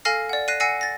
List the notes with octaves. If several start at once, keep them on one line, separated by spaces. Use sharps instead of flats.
A4 F5 G#5 F6 A#6 C7
D5 F#5
F#6 A#6 C7 D#7
F#5 G#5 E6 A#6 C7 C#7
A6 A#6